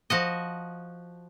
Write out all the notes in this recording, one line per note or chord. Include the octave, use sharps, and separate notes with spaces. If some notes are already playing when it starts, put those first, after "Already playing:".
F3 F#4 D#5